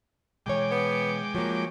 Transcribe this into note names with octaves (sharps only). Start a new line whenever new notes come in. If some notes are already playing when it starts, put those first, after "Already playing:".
B2 E3 G#3 C#5 G5 D6
B3
F3 F#3 A#3